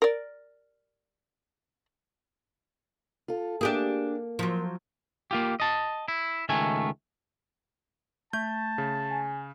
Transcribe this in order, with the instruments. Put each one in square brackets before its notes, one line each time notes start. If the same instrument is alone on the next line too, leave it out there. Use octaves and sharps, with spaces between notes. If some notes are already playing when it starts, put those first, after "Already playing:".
[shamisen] A#4 D5
[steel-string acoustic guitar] F4 A4
[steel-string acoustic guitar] A#3 [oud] D4 G4 G#4
[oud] F3 F#3
[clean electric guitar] A#3 F4 G4
D#5 A5
E4
C#2 D#3 A3 G#5
[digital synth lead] A3 [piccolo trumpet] A5 [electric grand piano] G6
[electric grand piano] C#3
[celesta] G#5